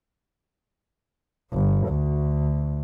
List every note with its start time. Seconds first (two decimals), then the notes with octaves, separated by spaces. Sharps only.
1.53 G1
1.88 D2